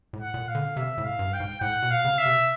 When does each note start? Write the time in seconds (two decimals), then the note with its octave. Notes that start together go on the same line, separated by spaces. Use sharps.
0.13 A2
0.20 F#5
0.34 A#2
0.48 F5
0.55 D3
0.76 C3 E5
0.98 A2
1.05 F5
1.19 G2
1.34 G5
1.40 G#2
1.61 A2 F#5
1.82 B2
1.91 F5
2.05 C#3
2.19 E5
2.26 C3